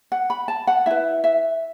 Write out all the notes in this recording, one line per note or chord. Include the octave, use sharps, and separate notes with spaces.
F#5
B5
A5
F#5
E4 B4 E5
E5